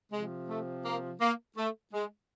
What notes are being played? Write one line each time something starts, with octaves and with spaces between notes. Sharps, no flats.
C3 F3 G#3
A3
A#3
A#3
A3
G#3